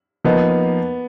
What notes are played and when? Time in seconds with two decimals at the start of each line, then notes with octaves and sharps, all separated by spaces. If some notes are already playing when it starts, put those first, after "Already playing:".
0.25 F3 A#3 B3 D#4